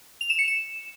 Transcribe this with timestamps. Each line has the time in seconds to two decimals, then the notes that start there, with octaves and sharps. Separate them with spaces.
0.21 F7
0.30 E7
0.39 C#7
0.48 E7